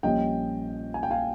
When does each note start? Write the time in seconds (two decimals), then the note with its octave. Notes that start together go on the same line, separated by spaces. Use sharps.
0.03 A#1 A#2 G3 C#4 D#5 G5
0.94 G#5
1.03 G5
1.11 F5 G#5